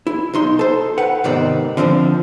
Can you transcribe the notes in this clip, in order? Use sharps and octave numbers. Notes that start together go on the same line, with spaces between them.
E4
B1 D#4 C6
A4 C5
B4 F#5
G#2 C3 D#3 B3 C4 D5
D3 F3 C4 D4